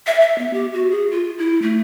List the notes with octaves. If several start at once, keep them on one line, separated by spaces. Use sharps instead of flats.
E5
E5
B3
G4
F#4
G#4
F4
E4
A3